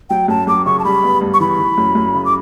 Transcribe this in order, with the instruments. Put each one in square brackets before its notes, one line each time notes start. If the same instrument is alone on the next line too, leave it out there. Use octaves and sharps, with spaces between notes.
[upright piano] F#3 [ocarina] G5
[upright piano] F#2 [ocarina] A5
[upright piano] F#2 [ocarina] D6
[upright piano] C#3 [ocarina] C#6
[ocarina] A5
[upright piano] G3 [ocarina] B5
[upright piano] B3
G2
[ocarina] C#6
[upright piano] E3 [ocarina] B5
[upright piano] E3
F#2
F#2
C#3
[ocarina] D6